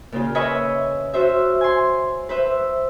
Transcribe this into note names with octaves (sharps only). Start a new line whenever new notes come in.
A#2 C#3 F4
B4 C#5 D#5 E5 G#5 B5
F4 F#4 C5 E5
G#5 C6
B4 C5 E5